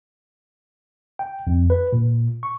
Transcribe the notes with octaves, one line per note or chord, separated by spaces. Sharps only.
G5
F2
B4
A#2
C#6